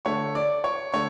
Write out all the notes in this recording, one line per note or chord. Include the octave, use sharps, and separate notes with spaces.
D3 A3 C#5 C#6
D5 D6
C#5 C#6
D3 A3 C#5 C#6